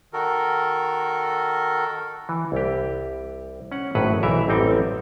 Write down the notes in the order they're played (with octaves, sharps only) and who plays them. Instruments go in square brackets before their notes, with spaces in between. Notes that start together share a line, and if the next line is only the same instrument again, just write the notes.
[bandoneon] D#3 F#4 A4 A#4
[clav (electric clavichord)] E3
C2 G4
C#4 F#5
G#1 A2 F#3 B4 C5 F#5
B1 E3 A#4 E5
A1 F#2 G3 C4 D#4 G5